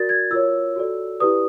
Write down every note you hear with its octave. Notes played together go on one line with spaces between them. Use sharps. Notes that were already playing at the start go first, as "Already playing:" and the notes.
Already playing: F#4 A#4 D5 A6
G#6
F4 A#4 C#5 E6
F#4 A4 D5
E4 G4 B4 D5 D#6